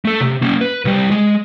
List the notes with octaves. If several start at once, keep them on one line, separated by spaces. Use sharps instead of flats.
A3 A4
C3
A#3 C#4
B4
C2 G3
G#3